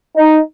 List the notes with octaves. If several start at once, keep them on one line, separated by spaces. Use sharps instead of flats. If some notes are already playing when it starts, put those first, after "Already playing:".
D#4